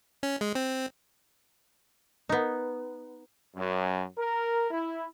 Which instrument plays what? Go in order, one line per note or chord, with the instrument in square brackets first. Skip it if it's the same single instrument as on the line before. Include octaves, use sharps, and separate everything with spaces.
[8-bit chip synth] C#4
G#3
C4
[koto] B3 D#4
[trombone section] F#2
A#4
E4